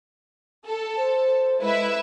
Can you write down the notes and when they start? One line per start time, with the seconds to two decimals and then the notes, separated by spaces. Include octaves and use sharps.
0.67 A4
0.97 C5
1.61 G#3 E4 B4 E5